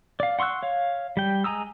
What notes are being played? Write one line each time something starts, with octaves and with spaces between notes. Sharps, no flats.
D5 F5
F#5 C6 C#6 E6 F#6
C#5 F5
G3 G5
G#3 G#5 A#5 D#6 E6